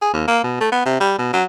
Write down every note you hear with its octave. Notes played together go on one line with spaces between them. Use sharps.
G#4
D#2
A#3
B2
A3
B3
C3
G3
B2
F#3